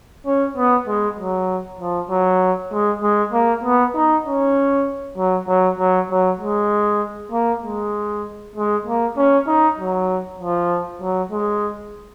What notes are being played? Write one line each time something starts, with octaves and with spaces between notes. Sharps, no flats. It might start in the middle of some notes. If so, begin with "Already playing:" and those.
C#4
B3
G#3
F#3
F3
F#3
G#3
G#3
A#3
B3
D#4
C#4
F#3
F#3
F#3
F#3
G#3
A#3
G#3
G#3
A#3
C#4
D#4
F#3
F3
F#3
G#3